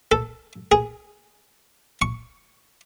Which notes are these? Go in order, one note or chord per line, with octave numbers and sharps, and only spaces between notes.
A4
G#4
C#6